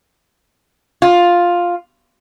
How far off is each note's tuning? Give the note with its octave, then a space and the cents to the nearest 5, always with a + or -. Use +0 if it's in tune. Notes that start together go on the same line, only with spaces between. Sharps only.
F4 +5